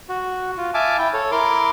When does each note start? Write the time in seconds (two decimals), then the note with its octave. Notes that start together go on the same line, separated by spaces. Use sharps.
0.09 F#4
0.58 F4
0.74 E5 F5 G#5 A5 D6
0.98 E4 G5
1.14 A4 C#5
1.32 E4 A#4 C6 D6